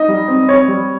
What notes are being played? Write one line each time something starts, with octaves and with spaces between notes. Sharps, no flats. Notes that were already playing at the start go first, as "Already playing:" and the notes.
Already playing: D#4 D#5
G3
C4
C4 C#5
G3